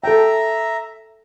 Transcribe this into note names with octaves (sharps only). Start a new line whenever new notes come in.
A4 E5 G5 A#5